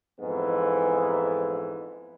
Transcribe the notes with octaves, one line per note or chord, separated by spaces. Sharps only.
F2 G#2 E3 B3